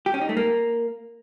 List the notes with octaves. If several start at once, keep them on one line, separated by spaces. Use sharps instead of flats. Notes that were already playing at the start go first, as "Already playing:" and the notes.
G4
C#4
D#4
A3
A#3